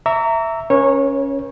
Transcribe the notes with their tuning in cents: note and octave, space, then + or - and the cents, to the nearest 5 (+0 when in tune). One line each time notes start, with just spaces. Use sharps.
E5 +0 A#5 -20 C#6 +40
C#4 +0 A#4 +45 C#5 -20